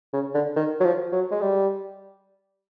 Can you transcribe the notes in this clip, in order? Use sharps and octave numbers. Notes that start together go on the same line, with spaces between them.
C#3
D3
D#3
F#3
F3
F#3
G#3
G3